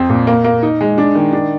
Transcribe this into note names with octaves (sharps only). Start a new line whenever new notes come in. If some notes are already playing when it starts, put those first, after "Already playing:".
Already playing: F2 C4
A#2
A#3
A#3
D#4
G#3
D4
D#3
D4